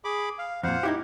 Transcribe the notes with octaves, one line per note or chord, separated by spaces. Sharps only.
G#4 B5 D6
F5
F2 A#2 C5 F5 F#5
D#4 E4 G4